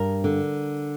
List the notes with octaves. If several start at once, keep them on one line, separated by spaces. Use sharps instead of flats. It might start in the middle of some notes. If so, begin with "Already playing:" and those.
Already playing: G2 A#4
D3